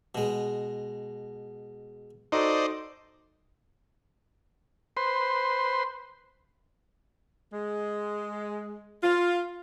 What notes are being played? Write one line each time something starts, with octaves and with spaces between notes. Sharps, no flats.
B2 G#3
D#4 F#4 A4 C5 D5 D#5
B4 C5 C6
G#3
F4